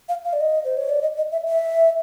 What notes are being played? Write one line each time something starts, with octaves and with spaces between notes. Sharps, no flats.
F5
F5
D5
D#5
C5
C#5
D5
D#5
D#5
E5
E5